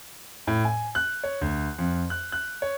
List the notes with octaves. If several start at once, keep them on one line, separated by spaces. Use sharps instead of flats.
A2
G#5
F#6
C#5
D2
F2
F#6
F#6
C#5